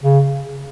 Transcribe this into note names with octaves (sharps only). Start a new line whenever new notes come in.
C#3